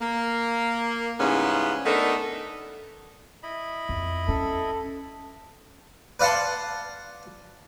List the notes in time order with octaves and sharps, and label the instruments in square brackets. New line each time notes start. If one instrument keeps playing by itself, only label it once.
[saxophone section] A#3
G#2 C#3 G3 B3 C#4 E4
A3 B3 D4 D#4 A4 A#4
[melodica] E4 D#5 B5
[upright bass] F2
[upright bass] C#4 [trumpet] A4
[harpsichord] B4 D5 F5 F#5 A5 C6